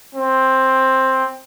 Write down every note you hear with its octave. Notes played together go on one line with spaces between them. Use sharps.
C4